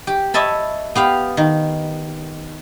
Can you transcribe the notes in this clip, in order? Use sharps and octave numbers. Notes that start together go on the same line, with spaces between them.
G4
C#5 D#5 E5 A5 B5
B3 G4 F5
D#3